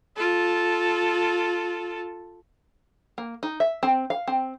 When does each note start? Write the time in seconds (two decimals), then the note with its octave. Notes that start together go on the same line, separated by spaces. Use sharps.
0.16 F4 A4
3.18 A#3
3.43 D#4
3.60 E5
3.83 C4
4.10 F5
4.28 C4